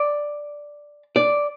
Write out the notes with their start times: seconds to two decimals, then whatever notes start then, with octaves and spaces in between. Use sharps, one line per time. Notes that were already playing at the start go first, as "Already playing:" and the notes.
Already playing: D5
1.16 D5